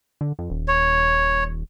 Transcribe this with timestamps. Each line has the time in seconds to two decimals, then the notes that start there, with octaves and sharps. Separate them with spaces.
0.21 D3
0.39 F2
0.50 D#1
0.68 C#5